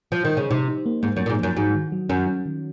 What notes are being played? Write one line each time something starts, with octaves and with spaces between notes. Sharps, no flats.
F3
D#3
C#3
C3 D#4
D#4
A#3
G#2 A#3
F#2
A#3
A#2
G#2
F#2 F3
G#2 F#4
D#3
F#3
F#2 C#4
C#4
D#3